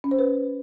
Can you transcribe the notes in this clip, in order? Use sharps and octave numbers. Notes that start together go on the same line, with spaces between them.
C#4
C5
B4